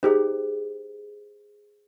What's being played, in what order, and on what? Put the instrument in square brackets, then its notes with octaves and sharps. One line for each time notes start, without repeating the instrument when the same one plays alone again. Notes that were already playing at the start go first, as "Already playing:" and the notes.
[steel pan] D#4 G4 [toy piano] G#4 C5